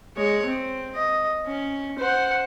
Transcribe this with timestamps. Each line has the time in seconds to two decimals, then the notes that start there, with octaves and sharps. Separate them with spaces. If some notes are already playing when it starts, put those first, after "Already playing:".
0.17 G#3 C#5
0.46 C4
0.95 D#5
1.47 C#4
1.99 C5 F#5